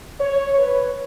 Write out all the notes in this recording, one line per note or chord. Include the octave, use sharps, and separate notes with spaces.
C#5
B4